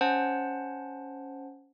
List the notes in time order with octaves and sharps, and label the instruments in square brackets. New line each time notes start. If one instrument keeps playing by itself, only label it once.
[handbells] C#4 C5 F#5 A5